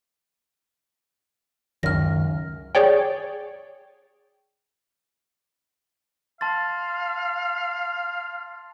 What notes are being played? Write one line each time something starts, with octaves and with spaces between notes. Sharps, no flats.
C#2 F#2 D#3 F6 A#6
G#4 C#5 D5 G5
F5 A5 C6 A6